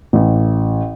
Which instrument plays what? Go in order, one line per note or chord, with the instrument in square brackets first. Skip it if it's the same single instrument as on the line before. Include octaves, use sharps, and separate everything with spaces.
[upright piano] A1